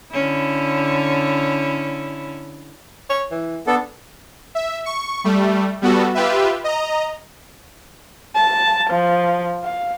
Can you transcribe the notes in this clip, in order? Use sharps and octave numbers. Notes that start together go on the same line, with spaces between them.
D3 C#4 E4
C#5
E3
B3 D4 A4
E5
C#6
G3 A3
G3 B3 F#4 A4
F4 G4 B4 E5
D#5 A#5
A5
F3
F5